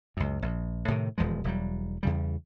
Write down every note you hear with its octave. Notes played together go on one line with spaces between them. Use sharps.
C#2 F#2
A#1
A2 C3 D#3
D#1 E2 F3 G#3
E1 F#3 G3
E2 C#3 G3